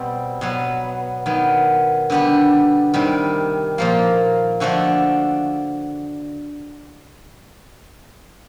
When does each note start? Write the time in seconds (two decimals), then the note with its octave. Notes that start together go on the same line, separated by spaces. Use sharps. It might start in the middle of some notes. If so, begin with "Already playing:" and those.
Already playing: B2 G3 C4
0.41 B2 F#3 B3
1.26 D#3 F#3 B3
2.10 D3 G3 B3 D4 G4
2.94 C3 D#3 G3
3.78 A#2 F3 A#3
4.60 D3 F3 A3 D4 F#4